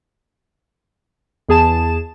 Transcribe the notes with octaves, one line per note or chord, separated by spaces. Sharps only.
E2 G#4 A5 E7